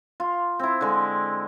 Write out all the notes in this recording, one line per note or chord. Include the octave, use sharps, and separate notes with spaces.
F4
C4 E4
D3 G#3